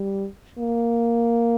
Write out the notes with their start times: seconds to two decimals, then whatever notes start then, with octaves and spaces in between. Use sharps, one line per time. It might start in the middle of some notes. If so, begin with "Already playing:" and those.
Already playing: G3
0.58 A#3